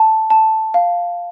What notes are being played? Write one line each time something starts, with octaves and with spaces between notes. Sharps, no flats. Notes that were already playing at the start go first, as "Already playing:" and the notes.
Already playing: A5
A5
F5